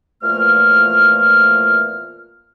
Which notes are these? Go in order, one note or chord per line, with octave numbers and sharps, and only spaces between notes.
E2 A#2 F3 A3 F6